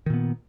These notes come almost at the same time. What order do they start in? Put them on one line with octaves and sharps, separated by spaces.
D#3 A#2 B3